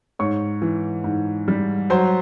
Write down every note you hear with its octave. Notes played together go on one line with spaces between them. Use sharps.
G#2 C#5 C#6
E3
G#2
G3
F#3 C5 C6